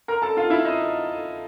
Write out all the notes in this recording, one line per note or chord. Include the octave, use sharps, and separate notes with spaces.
A#4 A#5
A4 A5
F4 F5
E4 E5
D#4 D#5